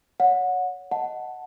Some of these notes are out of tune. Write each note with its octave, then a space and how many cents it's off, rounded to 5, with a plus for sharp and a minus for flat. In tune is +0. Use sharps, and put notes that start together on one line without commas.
C#5 +25 F#5 -25
D#5 +0 F#5 +0 A5 +0